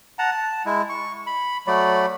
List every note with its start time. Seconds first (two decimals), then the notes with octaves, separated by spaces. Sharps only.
0.19 F#5 A5 A#5
0.31 A5
0.66 G#3 E4
0.89 C#6
1.27 B5
1.67 F#3 A3 D5 B5